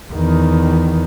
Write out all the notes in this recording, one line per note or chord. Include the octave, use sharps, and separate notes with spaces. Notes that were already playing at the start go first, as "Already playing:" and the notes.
E2 D#3